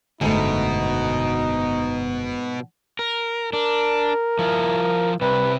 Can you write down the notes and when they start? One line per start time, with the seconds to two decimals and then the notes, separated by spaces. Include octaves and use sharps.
0.21 F#1 G#2 B2 D3 A3 D#4
2.99 A#4
3.53 D4 A#4
4.39 F3 E4
5.21 C3 G3 B4